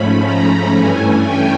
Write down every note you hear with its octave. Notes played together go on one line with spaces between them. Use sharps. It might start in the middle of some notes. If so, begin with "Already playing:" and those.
Already playing: G#2 F3 A3 C#4 B5
A#5
G2 E3 A3 C#4 G#5
G5